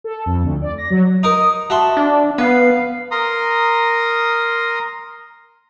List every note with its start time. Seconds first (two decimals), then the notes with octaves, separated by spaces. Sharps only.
0.04 A4
0.26 F2
0.43 D2
0.62 D5
0.78 A#6
0.90 F#3
1.23 D#4 A#4 D#6
1.70 F#4 E5 A5 C6
1.97 D4
2.38 B3 B4 F5
3.11 A#4 A#5 C6 D#6